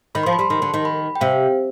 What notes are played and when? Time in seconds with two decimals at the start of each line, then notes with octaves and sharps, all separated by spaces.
0.15 D#3 B5
0.23 C6
0.26 F3
0.33 B5
0.39 G3 C6
0.50 D#3 C6
0.62 D3
0.74 D#3
0.85 B5
1.16 G5
1.21 C3 F5